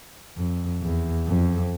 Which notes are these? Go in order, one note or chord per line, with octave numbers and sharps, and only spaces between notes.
F2
E2
F2